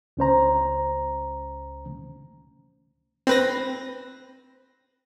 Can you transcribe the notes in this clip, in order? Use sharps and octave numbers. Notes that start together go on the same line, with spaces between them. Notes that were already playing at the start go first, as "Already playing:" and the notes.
C#2 C#4 C5 A#5
C4 B4 A#6